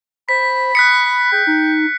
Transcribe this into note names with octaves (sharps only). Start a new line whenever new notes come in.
C5 B5 B6
D#6 F#6 B6 C#7
G#4 G5
D#4